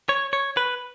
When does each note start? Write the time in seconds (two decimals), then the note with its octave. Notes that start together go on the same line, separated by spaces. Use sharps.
0.09 C#5
0.33 C#5
0.57 B4